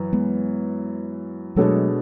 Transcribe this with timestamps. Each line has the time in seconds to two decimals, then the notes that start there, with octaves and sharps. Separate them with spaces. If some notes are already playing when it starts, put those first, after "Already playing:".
Already playing: F#2 E3
0.13 G#3 B3
1.56 B2 F#3 G#3 A3 D4 A4 C#5